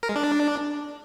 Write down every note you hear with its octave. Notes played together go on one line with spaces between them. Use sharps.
A#4
G#3
D4